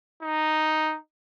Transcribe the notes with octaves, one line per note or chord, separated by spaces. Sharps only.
D#4